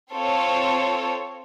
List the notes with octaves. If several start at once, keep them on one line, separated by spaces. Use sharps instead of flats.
C4 F4 A4 C#5